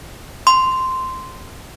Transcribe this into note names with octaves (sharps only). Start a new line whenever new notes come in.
C6